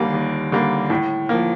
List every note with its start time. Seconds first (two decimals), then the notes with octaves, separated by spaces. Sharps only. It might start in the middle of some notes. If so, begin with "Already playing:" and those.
Already playing: D#2 D3 G3 A#3
0.14 D#2
0.52 D3 G3 A#3
0.90 A2
1.29 F3 A#3